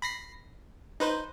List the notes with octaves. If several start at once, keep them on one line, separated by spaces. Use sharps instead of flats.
B5 A#6 C7
D#4 B4 C5